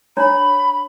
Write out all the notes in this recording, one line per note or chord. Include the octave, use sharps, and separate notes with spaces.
D4 C#5 A#5 B5